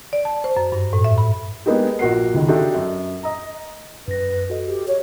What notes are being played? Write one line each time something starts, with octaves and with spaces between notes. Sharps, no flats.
D5
A5
C5
F#2
G2
A2
E5
B5
G#3 A#3 B3 D4 D#4 G4
A#1 F#4 A#4 F#5 C7
C#2 D3 D#3
D4 D#4 F#4 G4 A4 E5
F#2
D#5 A#5
F#2 B4 A#6
F#4 A4 D#5
G4
C#5